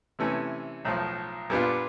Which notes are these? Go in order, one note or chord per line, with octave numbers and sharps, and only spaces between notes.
C3 E3 A3 C#4
B1 A2 F3
A#2 G3 B3 D4 F4